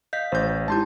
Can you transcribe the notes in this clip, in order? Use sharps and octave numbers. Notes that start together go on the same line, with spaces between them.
D#5 F5 G6 B6
A1 C5 G6
G#3 D#4 E4 G4 A5 C6 G6